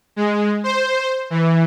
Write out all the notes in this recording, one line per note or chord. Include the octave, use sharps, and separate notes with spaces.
G#3
C5
E3